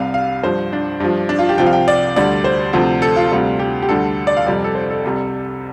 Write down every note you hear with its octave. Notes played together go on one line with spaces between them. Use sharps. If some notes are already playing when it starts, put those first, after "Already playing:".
Already playing: C2 C3 G3 F5
F5
G2 F3 C5
D4
G2 F3
D4
F4
G4
C2 C3 F3 G5
F5
G5
D5
D2 D3 G3 D5
C5
D2 C3 F3
A4
F4
D2 C3 G3 F4
G4
G4
D2 D3 G3 A4
D5
F5
F2 C3 G3 D5
A4
C5
A4
C2 C3 G3